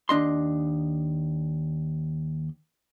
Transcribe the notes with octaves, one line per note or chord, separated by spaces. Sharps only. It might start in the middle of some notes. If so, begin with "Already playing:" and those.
D#2 D4 D#5 C6